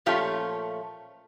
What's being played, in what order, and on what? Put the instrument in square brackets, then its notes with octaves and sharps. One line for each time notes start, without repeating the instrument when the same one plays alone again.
[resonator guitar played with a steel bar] A#2 F3 A3 C#4 F4 G4